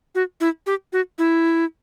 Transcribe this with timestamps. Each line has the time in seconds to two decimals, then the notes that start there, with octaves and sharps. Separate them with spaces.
0.15 F#4
0.41 E4
0.66 G4
0.93 F#4
1.18 E4